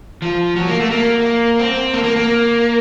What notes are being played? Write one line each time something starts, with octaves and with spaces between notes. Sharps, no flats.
F3
F#3
A#3
A3
A#3
C4
A#3
A#3
A#3